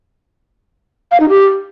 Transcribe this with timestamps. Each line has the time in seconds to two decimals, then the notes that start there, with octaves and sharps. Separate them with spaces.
1.11 F5
1.20 D#4
1.29 G4